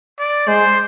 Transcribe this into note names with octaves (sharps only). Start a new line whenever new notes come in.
D5
G#3 C5